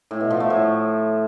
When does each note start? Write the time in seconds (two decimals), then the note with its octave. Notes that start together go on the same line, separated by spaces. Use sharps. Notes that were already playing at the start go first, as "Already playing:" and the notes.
0.11 A2
0.21 B2
0.30 F3
0.40 A3
0.50 A2